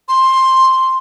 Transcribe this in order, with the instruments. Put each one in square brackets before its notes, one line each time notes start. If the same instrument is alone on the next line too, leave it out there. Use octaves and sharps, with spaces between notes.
[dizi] C6